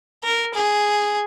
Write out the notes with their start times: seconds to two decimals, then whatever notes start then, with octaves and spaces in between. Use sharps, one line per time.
0.24 A#4
0.54 G#4